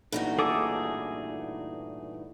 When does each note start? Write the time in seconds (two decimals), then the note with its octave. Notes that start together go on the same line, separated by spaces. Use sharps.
0.12 G2 A#2 E3 A3 D#4 F#4
0.39 G#4 A4 D6 D#6